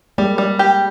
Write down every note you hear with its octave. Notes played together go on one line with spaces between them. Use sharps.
G3 G#3 A#3
G3
G4